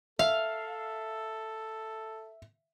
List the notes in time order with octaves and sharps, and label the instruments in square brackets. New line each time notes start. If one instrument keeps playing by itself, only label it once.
[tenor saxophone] A4 [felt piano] E5 [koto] F5